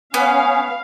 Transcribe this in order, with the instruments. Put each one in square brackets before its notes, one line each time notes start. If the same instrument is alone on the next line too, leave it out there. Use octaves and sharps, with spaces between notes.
[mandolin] B3 [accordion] C#4 [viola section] F5